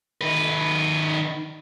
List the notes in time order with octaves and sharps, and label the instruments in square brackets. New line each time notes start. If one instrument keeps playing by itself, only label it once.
[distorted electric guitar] D#3 B4